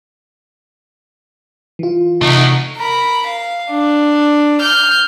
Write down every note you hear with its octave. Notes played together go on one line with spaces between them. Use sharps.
E3 F4
C3 A3 D#4 F#4
A#4 B5
F5
D4
F6 G6